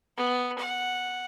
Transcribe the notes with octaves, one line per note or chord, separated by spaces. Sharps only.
B3
F#5